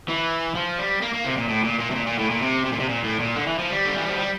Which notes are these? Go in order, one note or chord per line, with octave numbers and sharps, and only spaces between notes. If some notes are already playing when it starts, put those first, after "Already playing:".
E3
F3
G3
A#3
A#3
C3
A#2
A2
A#2
A#2
C3
A#2
A#2
A2
A#2
C3
C3
A#2
C3
A#2
A2
A#2
D3
E3
F3
G3
D3
E3
F3
G3